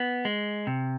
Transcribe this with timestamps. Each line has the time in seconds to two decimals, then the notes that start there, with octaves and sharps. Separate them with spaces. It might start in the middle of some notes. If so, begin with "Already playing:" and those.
Already playing: B3
0.25 G#3
0.67 C3